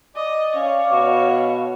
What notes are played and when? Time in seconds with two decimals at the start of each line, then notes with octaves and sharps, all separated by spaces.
0.16 D5 D#5
0.55 C#4 C#5 F5
0.92 B2 F#4